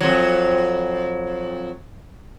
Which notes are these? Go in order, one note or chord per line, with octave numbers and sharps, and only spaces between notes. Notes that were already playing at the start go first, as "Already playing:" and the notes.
F2 F#3